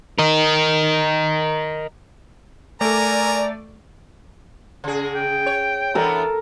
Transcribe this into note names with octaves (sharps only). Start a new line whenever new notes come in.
A#4 D#5
A3 A4 A#4 D5 G#5 A#5
C#3 G#4
G5
C#5
E3 B3 D4 A4 A#4